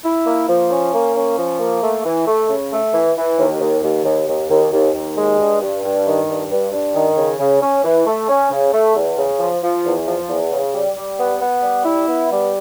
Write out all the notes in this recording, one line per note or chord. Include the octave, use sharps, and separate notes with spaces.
E4
A#3
F3
C#4
A#3
C#4
F3
A#3
A3
E3
A3
C#3
A3
E3
E3
D#2
D#2
D#2
D#2
D#2
D#2
D#2
D#2
G#3
G2
G2
G2
D#3
G2
G2
G2
D#3
C#3
C#3
C#4
E3
A3
C#4
C#3
A3
E2
C#3
F3
F3
E2
F3
E2
C#3
G3
G3
B3
B3
G3
E4
B3
G3